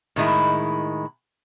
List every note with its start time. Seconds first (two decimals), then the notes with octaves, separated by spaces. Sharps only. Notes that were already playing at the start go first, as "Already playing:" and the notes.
0.16 A2 D#3 G#3 E4